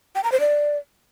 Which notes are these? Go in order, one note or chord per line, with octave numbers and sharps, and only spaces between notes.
G5
A#5
C5
D5